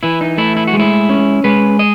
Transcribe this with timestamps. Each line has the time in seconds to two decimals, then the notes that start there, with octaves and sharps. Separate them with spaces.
0.03 E3 E4
0.21 D#4
0.38 A3 E4
0.56 E4
0.67 F#4
0.73 G#3
0.80 E4
1.09 C#4
1.44 G#3 B4
1.79 D#5